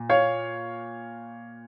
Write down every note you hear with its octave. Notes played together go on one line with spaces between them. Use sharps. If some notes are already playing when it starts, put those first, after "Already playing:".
Already playing: A#2
C#5 F5